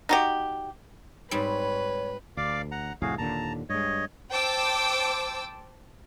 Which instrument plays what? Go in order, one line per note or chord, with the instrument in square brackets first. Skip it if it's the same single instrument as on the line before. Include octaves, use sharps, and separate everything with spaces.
[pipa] D#4 F#4 G4
[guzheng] G#2 G3 C4 [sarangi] B4 [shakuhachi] C#5
[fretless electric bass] D2 [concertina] D5 F5 D6
[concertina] F#5 A#5
[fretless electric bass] C2 F2 A2 [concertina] F#4 G#4 F5
[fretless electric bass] D#2 A#2 D3 [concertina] A5 A#5
[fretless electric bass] G2 G#3 [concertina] C#5 D#5
[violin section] C5 G5 A5 D6 E6